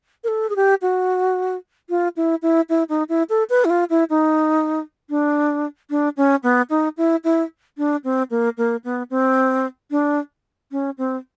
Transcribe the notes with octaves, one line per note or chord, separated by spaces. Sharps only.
A#4
A4
G#4
G4
F#4
F4
E4
E4
E4
D#4
E4
A4
B4
E4
F4
E4
D#4
D4
D4
C#4
B3
D#4
E4
E4
D4
C4
A#3
A#3
B3
C4
D4
C#4
C4